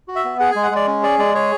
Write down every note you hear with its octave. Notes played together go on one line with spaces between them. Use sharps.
F#4
E5
B3
G#4 F#5
G#3 G#5
F#5
G#3 D5
C#4
G#4 D5
G#3 D5
G#4 C#5